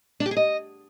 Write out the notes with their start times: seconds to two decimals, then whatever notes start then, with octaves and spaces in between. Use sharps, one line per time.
0.20 D4
0.26 G4
0.31 G#4
0.37 D#5